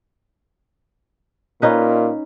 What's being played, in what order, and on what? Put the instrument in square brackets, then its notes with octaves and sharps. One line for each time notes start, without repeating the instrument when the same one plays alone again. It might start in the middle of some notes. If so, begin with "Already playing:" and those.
[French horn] A#2 [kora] C#4 D#4 B4